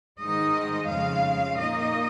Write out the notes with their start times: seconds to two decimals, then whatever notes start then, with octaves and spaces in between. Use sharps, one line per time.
0.21 G#2 D#3 G#3 D#4 D#5
0.89 F2 C#3 G#3 F5
1.57 A#2 A#3 D#4 D#5